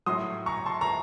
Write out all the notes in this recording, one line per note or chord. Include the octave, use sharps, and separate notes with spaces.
A2 F#3 C6 D#6
A#5 C#6
A5 C6
A#5 C#6